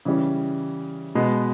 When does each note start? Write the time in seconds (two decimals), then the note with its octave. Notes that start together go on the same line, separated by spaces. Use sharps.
0.05 C#3 E3 G3 C#4
1.15 B2 G#3 B3